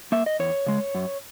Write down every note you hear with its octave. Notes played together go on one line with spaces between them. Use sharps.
A#3 E5
D#5
E2 C#5
C#3 G#3
F#2